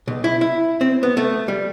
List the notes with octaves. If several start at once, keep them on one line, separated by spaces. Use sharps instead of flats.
B1
E4
E4
C4
B3
A3
G3